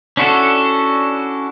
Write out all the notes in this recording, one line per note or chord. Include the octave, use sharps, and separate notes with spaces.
C#4 D4 E4 F#4 A4